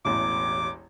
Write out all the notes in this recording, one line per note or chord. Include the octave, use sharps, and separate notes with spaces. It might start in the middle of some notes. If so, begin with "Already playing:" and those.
E1 A1 E2 D6